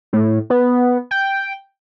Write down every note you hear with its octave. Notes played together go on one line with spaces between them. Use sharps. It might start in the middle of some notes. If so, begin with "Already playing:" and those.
A2
B3
G5